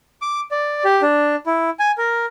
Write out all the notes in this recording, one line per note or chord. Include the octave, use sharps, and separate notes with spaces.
D6
D5
G4
D4
E4
G#5
A#4